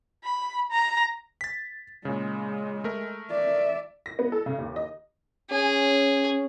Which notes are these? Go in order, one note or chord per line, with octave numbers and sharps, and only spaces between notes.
B5
A#5
A6 B6
A#2 C#3 G#3
A3 A#4
D5 E5
A#6
B3
A4
C#3
D#2
D#5
C#4 G#4